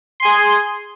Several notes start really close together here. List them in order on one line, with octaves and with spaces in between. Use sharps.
C6 G#5 G#4